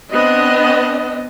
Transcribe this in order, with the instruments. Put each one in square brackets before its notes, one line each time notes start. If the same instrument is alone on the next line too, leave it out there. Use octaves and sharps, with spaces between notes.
[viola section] B3 C4 D4 D#5